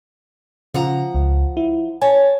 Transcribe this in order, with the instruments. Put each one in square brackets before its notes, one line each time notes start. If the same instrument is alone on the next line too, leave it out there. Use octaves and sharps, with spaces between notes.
[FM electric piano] C#3 [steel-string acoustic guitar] F3 F#5 A#5
[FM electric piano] C#2
E4
[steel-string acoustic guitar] C#5 A5 [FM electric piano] G#5